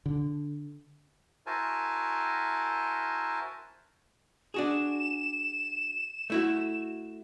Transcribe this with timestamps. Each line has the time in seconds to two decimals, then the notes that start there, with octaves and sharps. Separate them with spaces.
0.06 D3
1.46 E4 F#4 A#4 C5 G#5 A5
4.54 D4 F#4 G#4 E7
6.30 A3 E4 F#4